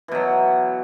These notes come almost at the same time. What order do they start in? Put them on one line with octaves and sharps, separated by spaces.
E3 B2 F#3